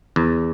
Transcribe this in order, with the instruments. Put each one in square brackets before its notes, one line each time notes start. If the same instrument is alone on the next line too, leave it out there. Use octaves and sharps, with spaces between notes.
[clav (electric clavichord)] E2